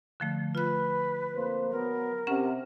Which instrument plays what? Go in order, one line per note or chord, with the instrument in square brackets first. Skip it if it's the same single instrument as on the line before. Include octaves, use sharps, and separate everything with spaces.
[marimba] D3 F3 A3
[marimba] F4 F#6 [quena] B4
[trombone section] F2 A#3 C5
[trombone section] F#3 B3 [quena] A#4
[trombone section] C3 [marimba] C#4 F#5